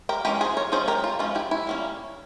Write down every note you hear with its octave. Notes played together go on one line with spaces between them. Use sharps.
G4 A#4
E3 G#3 C#4 G4 A#4
G#4 C5
A#4 C#5
F3 G#3 C#4 G#4 C5
G4 A#4
F4
F3 G#3 C#4 F4
E4 G4
E4
G3 A#3 C#4